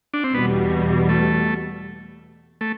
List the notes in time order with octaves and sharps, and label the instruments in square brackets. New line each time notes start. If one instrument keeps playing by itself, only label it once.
[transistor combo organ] D4
C4
[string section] E2 B2 G3 [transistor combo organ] B3
[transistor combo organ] A3
A3